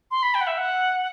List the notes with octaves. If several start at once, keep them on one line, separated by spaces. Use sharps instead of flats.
C6
B5
G5
F#5
E5
F#5